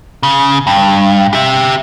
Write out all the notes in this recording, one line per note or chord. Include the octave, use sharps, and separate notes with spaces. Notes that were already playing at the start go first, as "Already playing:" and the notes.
C#3
G2
G4 E5